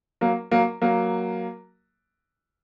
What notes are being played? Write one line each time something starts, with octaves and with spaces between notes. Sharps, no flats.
F#3 A#3
F#3 A#3
F#3 A#3